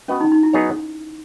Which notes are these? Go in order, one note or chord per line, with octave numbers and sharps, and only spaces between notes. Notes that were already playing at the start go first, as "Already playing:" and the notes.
B3 C#4 F#4 B4 D#5
D#4
D#4
E4
F#3 B3 D#4 G#4 C#5